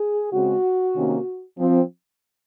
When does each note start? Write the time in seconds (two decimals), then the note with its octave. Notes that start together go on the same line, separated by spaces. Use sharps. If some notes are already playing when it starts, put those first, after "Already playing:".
Already playing: G#4
0.32 C#3 G#3 C4 F#4
0.94 C3 D#3 A#3 C#4
1.57 F3 C4